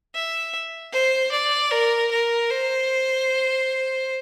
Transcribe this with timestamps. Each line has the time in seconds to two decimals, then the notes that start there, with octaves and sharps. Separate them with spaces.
0.15 E5
0.93 C5
1.31 D5
1.71 A#4
2.11 A#4
2.50 C5